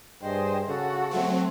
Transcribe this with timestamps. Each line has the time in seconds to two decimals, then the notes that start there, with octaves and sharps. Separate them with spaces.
0.22 G2 G#4 C5 D#5 G5
0.67 C#3 F#4 A4
1.11 F#3 A3 C4 F#5